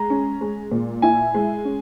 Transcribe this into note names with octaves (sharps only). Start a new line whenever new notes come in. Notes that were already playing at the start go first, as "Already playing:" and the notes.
Already playing: G#3 A#5
C#4
G#3
A#2
E4 G#5
G#3
C#4